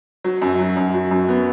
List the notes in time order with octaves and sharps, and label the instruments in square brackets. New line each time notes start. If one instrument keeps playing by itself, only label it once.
[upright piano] F#3
F#2
F#3
F#2
F#3
F#2
B3